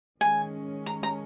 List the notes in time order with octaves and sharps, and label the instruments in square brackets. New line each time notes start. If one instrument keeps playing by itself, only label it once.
[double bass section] D#3 G#3 C#4 [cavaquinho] G#5
[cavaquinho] A#5
A#5